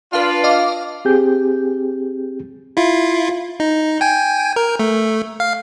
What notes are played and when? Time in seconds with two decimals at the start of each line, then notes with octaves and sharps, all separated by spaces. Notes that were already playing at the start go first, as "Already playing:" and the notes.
0.13 D4 F4 B4 F5
0.44 D#5 F5 D6
1.05 C4 G4 G#4 G6
2.77 E4 F4
3.60 D#4
4.01 G5 G#5
4.56 A#4
4.80 A3
5.40 F5